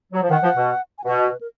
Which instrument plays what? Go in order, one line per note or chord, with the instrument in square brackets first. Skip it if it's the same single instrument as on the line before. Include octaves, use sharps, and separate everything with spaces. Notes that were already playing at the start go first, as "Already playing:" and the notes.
[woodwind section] F#3
F3
[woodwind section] D#3 [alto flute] F#5
[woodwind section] F3
B2
[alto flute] G#5
[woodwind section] B2 [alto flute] F#5
[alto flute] D#5
B4
A#4